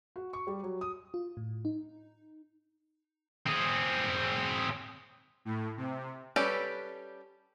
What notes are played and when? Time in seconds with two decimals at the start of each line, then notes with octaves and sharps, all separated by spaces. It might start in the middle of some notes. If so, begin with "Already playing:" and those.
0.16 F#4
0.33 C#6
0.47 G3
0.63 F#3
0.81 D#6
1.14 F4
1.37 A2
1.65 D#4
3.46 C4 G#4
5.45 A2
5.77 C3
6.36 G3 C#4 G4 A4 B4